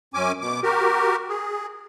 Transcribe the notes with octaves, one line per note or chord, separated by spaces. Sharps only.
F#2 C#4 G#5 D6
B2 D6
F#4 G4 A#4
G#4